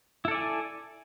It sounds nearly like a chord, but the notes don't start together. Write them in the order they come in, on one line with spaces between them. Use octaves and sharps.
E4 A4 D5 G#5